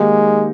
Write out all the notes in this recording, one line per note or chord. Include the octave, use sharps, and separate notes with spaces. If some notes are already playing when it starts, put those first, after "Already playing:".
Already playing: D#3 G#3 A#3 D#4 G4